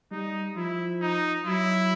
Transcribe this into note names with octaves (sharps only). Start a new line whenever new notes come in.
G3 D#4
F3 E4
D#4
F#3 E4